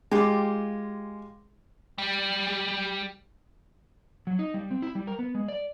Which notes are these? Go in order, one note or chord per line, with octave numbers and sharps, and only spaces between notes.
G#3 F4 G4
G3 G4
F#3
D#4
G3
C4
E4
G3
A#4
B3
G#3
D5